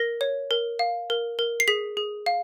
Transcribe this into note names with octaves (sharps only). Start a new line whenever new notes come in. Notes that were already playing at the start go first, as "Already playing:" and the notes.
Already playing: A#4 A#6
C#5
A#4
F5
A#4
A#4
C7
G#4 B6
G#4
F5